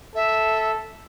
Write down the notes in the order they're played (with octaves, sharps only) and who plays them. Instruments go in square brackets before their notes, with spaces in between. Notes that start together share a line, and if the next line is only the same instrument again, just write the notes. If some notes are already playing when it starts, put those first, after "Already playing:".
[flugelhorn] A4 [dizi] E5